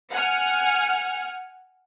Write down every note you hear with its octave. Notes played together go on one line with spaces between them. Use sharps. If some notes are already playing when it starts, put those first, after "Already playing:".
F#5 G#5 F6